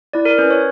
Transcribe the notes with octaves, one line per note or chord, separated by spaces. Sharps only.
E4 D5
A#4
C#4 B4
C#5